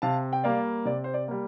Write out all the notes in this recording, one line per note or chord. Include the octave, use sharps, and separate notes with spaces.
C3 F5 A5
G5
G3 A#3 D5 F5
C3 D5
C5
D5
G3 A#3